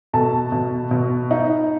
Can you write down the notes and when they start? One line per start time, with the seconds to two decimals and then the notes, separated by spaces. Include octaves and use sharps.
0.13 B2 A4 A5
0.52 B2
0.91 B2
1.31 D#4